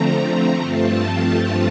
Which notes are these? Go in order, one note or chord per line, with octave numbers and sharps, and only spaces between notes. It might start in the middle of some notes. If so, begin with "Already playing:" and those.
Already playing: D3 F3 A3 C4 A#5
A#5
G2 F3 A3 C4 F4 A5